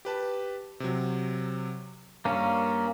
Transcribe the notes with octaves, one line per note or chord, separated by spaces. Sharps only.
G4 B4 A5
C3 F#3
G2 A#3 C#4